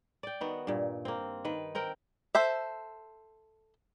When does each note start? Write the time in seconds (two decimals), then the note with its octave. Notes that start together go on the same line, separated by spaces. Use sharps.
0.23 D5 G5
0.41 D#3 B3 F#4
0.67 G2 A#2
1.05 A#3 C4
1.45 D#3 B4
1.75 C4 A#4 F#5 G5
2.35 A4 C5 E5